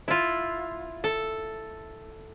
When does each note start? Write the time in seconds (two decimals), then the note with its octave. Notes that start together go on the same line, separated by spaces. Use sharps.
0.08 E4 F4
1.04 A4